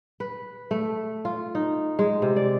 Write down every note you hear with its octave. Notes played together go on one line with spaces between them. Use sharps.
B4
A3
F4
D#4
G#3
C3
D5